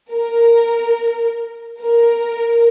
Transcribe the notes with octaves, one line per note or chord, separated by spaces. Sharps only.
A#4
A#4